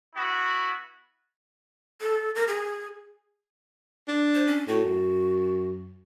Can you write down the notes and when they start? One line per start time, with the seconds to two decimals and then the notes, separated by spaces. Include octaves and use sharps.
0.14 B3 E4 F#4
2.01 A4
2.35 A#4
2.48 G#4
4.08 D4
4.35 C5
4.47 C#4
4.68 A2 F#4
4.85 F#2